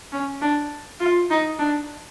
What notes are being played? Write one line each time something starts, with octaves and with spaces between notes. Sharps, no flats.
C#4
D4
F4
D#4
D4